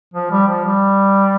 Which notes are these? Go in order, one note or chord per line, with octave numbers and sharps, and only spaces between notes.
F3
G3
F3
G3